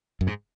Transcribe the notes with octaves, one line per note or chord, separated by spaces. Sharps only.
F#2
G#2